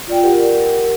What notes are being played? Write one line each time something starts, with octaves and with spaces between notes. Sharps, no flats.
F4 D5 G5
G4 A#4 F#5